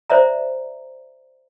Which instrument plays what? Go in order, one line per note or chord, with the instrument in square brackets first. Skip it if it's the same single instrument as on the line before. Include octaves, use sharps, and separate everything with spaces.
[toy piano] C5 D5 E5 A#5